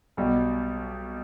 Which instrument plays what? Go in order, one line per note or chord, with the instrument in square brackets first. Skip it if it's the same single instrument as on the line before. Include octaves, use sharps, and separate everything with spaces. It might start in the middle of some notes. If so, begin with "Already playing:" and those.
[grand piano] B1 B2 G3